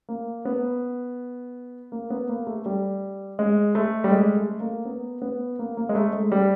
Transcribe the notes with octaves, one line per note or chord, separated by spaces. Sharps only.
A#3
B3
A#3
B3
A#3
A3
G3
G#3
A3
G3
G#3
A3
A#3
B3
B3
A#3
A#3
G#3
A3
G#3
G3